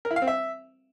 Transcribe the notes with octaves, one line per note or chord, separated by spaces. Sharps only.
A#4
E4
F5
C4
E5